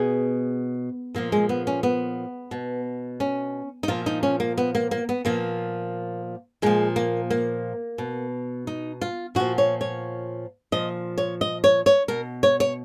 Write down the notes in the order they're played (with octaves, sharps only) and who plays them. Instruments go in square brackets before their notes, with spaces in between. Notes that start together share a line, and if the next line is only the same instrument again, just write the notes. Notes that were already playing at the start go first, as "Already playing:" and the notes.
Already playing: [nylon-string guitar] B2 G#4
A#2 F3 A#3
G#3
B3
C#4
B3
B2
C#4
D#4
A#2 F3 F4
D#4
C#4
A#3
B3
A#3
A#3
B3
A#2 F3 A#3
A#2 F3 G#3
A#3
A#3
B2
D#4
F4
A#2 F3 F#4
C#5
C#5
A#2 F3 D#5
C#5
D#5
C#5
C#5
B2 A#4
C#5
C#5